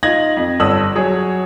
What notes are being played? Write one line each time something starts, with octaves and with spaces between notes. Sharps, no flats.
D#4 F4 G#6 A#6 F#7
F2
G1 A4 C#5 D#6 E6 F#7
F#3 G#4 C#5